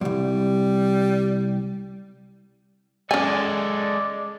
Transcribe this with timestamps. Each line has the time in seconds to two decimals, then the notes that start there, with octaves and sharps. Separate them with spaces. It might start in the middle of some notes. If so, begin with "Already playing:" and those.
0.01 C2 F#2 G3
3.11 G#3 C#4 A4 D5 G#5